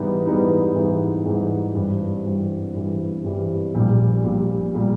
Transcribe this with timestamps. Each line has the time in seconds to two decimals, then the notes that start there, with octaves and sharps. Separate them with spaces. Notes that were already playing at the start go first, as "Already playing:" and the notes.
Already playing: G#2 E3 G3 B3 D#4
0.26 G#2 E3 G3 B3 D#4
0.76 G#2 E3 G3 B3 D#4
1.26 G#2 E3 G3 B3 D#4
1.75 G2 E3 G3 C4
2.25 G2 E3 G3 C4
2.74 G2 E3 G3 C4
3.24 G2 E3 G3 C4
3.75 A#1 A#2 G3
4.24 A#1 A#2 G3
4.74 A#2 G3